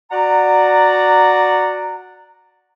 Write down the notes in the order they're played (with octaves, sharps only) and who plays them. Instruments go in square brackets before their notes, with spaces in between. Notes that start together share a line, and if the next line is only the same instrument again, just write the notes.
[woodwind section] F#4 D5 F#5 A#5